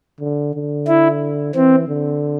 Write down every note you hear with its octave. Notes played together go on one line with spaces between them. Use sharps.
D3
D3
E4
E3 C4
D3